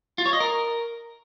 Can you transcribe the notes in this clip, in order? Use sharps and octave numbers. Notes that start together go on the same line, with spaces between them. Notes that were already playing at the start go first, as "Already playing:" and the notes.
F4
C#5
D#5
A#4